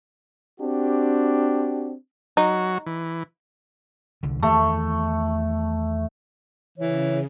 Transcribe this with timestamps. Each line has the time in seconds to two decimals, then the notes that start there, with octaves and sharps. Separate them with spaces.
0.60 C4 D4 F#4 G4
2.37 F#3 D#4 F#4
2.86 E3
4.23 C2 D3
4.43 E2 D#3 E3 A3
6.78 C#3 E3 C#5